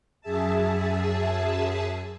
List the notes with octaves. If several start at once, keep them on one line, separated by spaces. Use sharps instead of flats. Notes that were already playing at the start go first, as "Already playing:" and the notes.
F#2 G#4 E5 A5